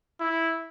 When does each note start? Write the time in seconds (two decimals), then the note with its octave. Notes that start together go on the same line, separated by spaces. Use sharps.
0.21 E4